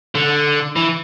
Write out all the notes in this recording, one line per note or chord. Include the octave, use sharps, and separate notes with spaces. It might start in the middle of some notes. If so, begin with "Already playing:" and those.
D3
E3